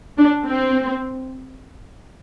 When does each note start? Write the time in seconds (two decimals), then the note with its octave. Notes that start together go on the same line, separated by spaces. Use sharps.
0.18 D4
0.46 C4